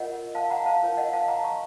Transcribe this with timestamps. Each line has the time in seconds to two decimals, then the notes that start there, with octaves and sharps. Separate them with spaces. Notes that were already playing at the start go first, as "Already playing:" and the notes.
Already playing: F4 A#4 C#5 D#5 F#5
0.35 F5 A5
0.51 F#5 A#5
0.66 F5 A5
0.82 F4 A#4 C#5
0.97 D#5 F#5
1.13 F5 A5
1.28 F#5 A#5
1.44 A#5 C#6